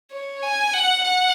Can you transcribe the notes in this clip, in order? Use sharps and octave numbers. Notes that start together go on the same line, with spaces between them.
C#5
G#5
F#5
F#5